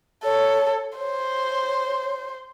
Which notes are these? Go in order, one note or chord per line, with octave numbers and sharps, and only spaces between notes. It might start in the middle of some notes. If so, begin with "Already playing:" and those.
A4 C#5
C5 C#5